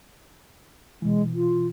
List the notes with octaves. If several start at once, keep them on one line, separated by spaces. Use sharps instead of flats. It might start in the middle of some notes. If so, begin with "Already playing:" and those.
B2 E3 G#3
F4